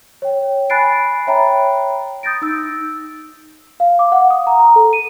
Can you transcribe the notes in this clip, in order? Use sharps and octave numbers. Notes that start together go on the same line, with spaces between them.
C#5 G5
G#5 B5 F#6 A6 C7 D7
C#5 E5 G5 A#5 B5
D#6 G6 A6 A#6 D7
D#4 E6
F5
D6
F#5
D#6
A#5
A#5
A4
D#7